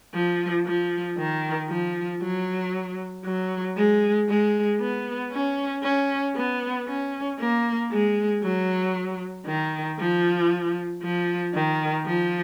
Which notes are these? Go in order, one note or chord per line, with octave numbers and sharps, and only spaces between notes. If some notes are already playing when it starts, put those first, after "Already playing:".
F3
F3
D#3
F3
F#3
F#3
G#3
G#3
B3
C#4
C#4
B3
C#4
A#3
G#3
F#3
D#3
F3
F3
D#3
F3